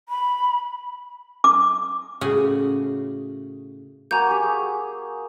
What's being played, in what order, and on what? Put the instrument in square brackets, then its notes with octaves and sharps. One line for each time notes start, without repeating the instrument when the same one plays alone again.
[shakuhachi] B5
[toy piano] D6
[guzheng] A2 C#3 F#4 G#4 F#5 G#5
[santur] A#3 F#4 G#5 [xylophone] A#5 G6
[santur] G4 C#6
G#4